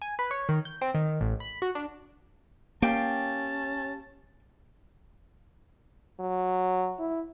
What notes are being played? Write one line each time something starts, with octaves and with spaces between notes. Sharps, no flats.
G#5
B4
C#5
D#3
G6
C4
D#3
A1
B5
F#4
D4
A#3 C#4 G4 F5 G5 A5
F#3
E4